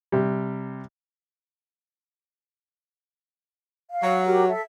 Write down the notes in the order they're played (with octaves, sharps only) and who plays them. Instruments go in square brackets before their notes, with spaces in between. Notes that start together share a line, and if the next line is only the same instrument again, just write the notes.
[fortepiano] C3 G3
[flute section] F5
[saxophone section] F#3
[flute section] F#4 G4 A#4
A4 E5